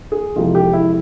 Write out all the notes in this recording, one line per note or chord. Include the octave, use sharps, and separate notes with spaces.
G#4
F2 C3 E3 G#3 F4
G4
E4